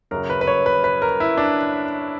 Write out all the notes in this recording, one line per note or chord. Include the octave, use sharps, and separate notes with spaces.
F#2 C#3 F#3 A#4
B4
B4
C#5
B4
B4
A#4
E4
D4